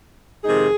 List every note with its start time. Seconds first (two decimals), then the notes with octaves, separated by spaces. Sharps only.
0.45 F2 C3 D#3 G#3 D#4 G#4